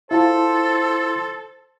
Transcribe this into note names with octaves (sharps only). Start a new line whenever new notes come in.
E4 F4 A4 C5 A5